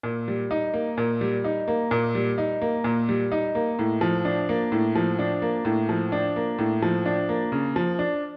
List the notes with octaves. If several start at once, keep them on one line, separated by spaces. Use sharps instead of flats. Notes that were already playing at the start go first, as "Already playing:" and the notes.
A#2
G3
D#4
A#3
A#2
G3
D#4
A#3
A#2
G3
D#4
A#3
A#2
G3
D#4
A#3
A2
F3
D4
A#3
A2
F3
D4
A#3
A2
F3
D4
A#3
A2
F3
D4
A#3
C#3
F3
D4